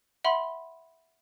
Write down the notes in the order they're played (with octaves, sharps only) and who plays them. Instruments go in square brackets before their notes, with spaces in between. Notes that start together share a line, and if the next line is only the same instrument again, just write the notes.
[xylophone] E5 F#5 B5 C6